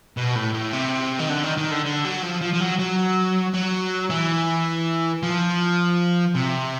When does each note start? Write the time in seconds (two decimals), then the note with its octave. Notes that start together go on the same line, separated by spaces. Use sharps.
0.17 B2
0.36 A2
0.54 A2
0.73 C3
1.19 D#3
1.29 D3
1.43 D#3
1.57 D#3
1.71 D3
1.85 D3
2.05 F#3
2.23 F3
2.42 F3
2.54 F3
2.61 F#3
2.79 F#3
3.54 F#3
4.10 E3
5.23 F3
6.35 C3